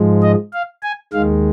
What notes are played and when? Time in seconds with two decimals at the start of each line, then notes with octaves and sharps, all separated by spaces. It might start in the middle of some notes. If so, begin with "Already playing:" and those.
Already playing: G#2 F3 G#3
0.23 D#5
0.53 F5
0.83 G#5
1.13 D#2 D#3 G#3 F5